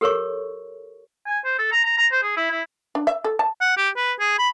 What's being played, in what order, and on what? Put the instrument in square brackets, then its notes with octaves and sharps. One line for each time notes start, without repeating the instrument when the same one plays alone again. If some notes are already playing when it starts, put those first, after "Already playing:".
[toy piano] G4 A4 A#4 C#5 C#6
[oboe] G#5
C5
A4
A#5
A#5
A#5
C5
G#4
E4
E4
[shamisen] D4
E5
A4
A5
[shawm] F#5
G4
B4
G#4
B5